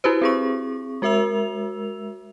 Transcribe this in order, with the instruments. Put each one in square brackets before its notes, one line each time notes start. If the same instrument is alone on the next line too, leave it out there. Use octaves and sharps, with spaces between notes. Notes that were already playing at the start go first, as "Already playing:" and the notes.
[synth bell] E4 F#4 G4 B4 C5
C4 G#4 C#6
G#3 F#4 A#4 E5 E6 F7